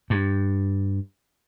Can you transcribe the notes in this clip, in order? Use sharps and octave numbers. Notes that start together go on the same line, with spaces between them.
G2